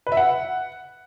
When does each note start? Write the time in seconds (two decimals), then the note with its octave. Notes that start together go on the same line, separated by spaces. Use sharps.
0.07 B4
0.12 E5
0.17 F#5